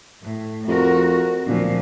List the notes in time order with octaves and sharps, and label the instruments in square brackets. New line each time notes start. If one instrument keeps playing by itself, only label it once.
[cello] A2
[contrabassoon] F2 [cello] F#4 A#4
[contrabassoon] D1 [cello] A#2 F3